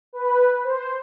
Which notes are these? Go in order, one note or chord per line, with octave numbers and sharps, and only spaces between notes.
B4
C5